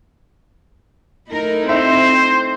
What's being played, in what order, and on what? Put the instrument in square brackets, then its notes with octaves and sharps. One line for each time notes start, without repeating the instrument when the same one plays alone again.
[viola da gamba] A3 D#4 E4 [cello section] A#4
[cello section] C4 [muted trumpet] C5 [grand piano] E5